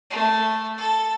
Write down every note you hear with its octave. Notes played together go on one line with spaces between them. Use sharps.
A3
A4